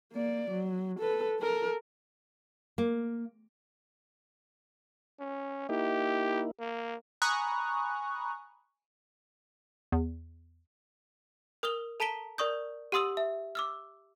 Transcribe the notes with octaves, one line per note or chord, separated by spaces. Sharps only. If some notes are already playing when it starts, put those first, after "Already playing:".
A#3 D5
F#3
A4 B4
A4 A#4
A#3
C#4
A#3 D#4 E4 G4
A#3
G#5 A#5 B5 C#6 D#6 F#6
E2
A#4 D#6 F6 F7 G7
A4 A5 A#5 B6 D7 G7
A#4 D5 C#6 D#6 G6
G4 F#5 C6 D#6 E6 F#7
E5
D6 E6 F6